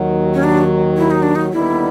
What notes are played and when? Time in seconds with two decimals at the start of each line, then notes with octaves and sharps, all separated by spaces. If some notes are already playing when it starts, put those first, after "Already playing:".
Already playing: D#2 D#3 F#3
0.34 C#4
0.44 D4
0.98 E4
1.11 D#4
1.23 D4
1.36 D#4
1.52 D#2 D3 G3 B3 D#4 E4